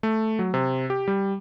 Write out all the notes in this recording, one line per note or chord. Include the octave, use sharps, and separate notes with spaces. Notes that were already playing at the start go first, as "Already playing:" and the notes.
A3
F#3
C3
G4
G3